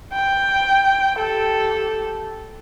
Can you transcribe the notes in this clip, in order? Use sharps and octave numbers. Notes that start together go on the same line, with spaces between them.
G5
G4 A4